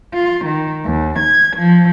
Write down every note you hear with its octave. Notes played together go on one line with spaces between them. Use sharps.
F4
D#3
D#2
G#6
F3